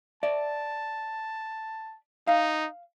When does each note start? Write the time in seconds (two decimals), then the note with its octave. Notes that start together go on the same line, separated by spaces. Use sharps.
0.23 D5 E5 A5
2.27 D#4 F5